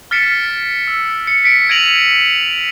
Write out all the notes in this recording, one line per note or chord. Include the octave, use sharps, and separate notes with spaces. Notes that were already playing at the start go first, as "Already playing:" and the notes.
F6 A6 B6 C#7 D7 E7
E6
C#7
B6 C#7 D7
G#6 A#6 D7 D#7 F7 F#7